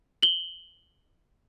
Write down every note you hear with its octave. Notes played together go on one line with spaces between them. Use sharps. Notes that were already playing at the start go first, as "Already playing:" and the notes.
F#7 G7